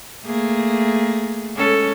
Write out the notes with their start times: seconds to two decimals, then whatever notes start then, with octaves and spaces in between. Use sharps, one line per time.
0.24 A3 A#3 G#4
1.56 G#3 C#4 A4